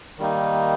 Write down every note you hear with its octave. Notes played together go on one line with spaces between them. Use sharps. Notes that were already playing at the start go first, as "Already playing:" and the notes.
D#3 G3 A#3 D#4